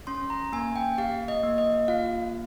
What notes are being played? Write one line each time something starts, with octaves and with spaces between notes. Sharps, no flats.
C#4 C6
A#5
A#3 G#5
G5
G4 F5
D#5
A#3
D#5
F4 F5